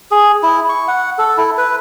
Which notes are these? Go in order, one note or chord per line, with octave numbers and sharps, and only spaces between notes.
G#4
E4
C#6
F#5
A4
E4
B4